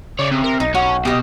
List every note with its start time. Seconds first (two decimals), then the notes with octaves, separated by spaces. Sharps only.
0.19 C#3 C#5 D5
0.32 C3
0.44 A#4
0.60 B1 D#4
0.75 C#4 F#4
1.05 B2 G4 D#5